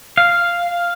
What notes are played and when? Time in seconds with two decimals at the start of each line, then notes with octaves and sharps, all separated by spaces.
0.17 F5